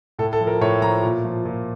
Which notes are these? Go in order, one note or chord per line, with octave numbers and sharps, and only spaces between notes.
A2 A4
A4
F3
A#4
A2 C#5
F3 A#5
A#2
F3
A#2